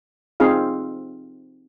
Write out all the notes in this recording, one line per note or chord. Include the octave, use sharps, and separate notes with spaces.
C4 D#4 F4 G#4 F5